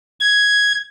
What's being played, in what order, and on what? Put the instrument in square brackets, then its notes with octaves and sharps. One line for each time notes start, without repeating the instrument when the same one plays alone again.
[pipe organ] G#6